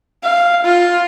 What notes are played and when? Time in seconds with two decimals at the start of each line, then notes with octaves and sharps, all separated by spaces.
0.23 F5
0.65 F4